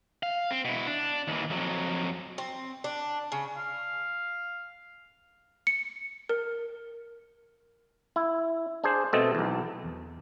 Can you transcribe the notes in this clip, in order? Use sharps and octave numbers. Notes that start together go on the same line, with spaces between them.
F5
C4
B2 E4
D4
D#2 E3
F2 F#3
C4
D4
C#3
F5
C#7
A#4
E4
D4 G#4 C5
B2 A3 C4 A4 D#5
B1 E2
E2